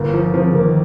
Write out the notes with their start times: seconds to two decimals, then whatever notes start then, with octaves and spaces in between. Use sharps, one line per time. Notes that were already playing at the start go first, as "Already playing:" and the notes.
Already playing: G1 A#3
0.14 F3
0.34 C3 F3
0.48 C#3
0.54 A#3
0.62 D#3